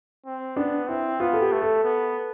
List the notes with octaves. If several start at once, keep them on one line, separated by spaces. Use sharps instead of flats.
C4
B3 D4
C4 E4
B3 F4
A4
G4
A3
A4
B3